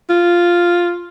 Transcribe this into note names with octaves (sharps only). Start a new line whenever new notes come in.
F4